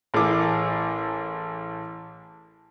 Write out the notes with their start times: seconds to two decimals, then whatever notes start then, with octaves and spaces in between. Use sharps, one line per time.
0.14 A1 A3 E4 G#4 A#4 D6